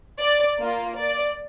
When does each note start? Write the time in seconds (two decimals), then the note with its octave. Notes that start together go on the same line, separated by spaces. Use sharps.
0.20 D5
0.59 A#3 F4
0.98 D5